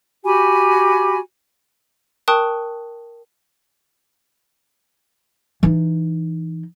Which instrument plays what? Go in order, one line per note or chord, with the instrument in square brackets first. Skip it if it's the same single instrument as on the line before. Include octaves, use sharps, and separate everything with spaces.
[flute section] F#4 G4 G#5 B5
[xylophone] A#4 G5 A5 C#6 D#6 F#6
[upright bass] E3 D#4